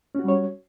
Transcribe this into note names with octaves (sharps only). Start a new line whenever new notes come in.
G3 C#4 F#4 C#5